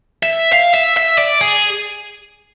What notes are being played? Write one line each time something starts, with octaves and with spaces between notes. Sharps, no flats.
E5
F5
E5
E5
D5
G#4